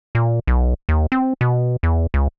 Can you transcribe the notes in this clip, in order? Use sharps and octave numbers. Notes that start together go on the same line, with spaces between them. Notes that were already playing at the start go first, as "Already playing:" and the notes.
A#2
B1
D#2
C4
B2
E2
C#2